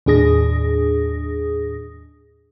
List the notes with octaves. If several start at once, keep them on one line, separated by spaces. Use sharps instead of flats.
D#2 A2 D4 G#4 D#6 A#6